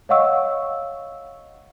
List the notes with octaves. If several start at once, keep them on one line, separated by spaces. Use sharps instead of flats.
C#5 D#5 F5 F#5 C#6 E6